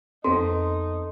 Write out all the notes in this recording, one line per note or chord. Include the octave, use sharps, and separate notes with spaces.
F2 B3 C4 D#4 A4 C6